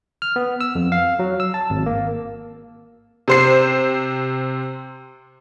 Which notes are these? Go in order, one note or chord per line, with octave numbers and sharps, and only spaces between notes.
F6
B3
E6
F2
F5
F#3
E6
A5
G#1
A#3
C3 C5 C7